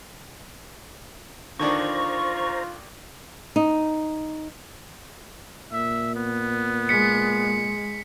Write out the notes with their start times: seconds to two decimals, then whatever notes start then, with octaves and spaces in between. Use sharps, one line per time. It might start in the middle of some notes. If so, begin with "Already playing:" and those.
1.59 D3 D#3 D4 F4 C5 A#5 C#6
3.56 D#4
5.72 A#2 E5
6.15 B3
6.89 G#3 B6 C#7